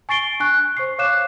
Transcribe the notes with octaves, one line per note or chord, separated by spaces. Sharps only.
G#5 C#6 A6 C7 D7 G7
D4 G#5 C#6 F#6
C5 C#6 C7
C#5 F5 D6 F#6 C7 E7